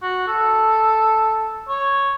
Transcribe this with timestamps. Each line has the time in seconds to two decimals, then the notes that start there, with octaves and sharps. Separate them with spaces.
0.02 F#4
0.28 A4
1.68 C#5